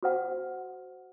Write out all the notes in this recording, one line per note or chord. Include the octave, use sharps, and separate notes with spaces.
F#4 C5 F#5